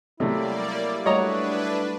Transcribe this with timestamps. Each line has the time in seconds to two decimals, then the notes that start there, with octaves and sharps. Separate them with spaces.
0.20 C3 F#3 G3 A3 A#3 E4 A4 D5
1.06 G3 A3 D4 F#4 B4 C#5 D#5 A#5